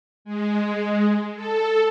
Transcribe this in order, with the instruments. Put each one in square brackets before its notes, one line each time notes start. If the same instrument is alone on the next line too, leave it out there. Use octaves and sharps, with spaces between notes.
[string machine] G#3
A4